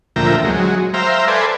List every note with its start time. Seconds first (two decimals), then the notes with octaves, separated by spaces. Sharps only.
0.16 D2 A#2 F3 E5 G5 A#5
0.45 F#3 G#3
0.94 C5 E5 F5 G5 A#5
1.28 A4 B4 C5 D5 G#5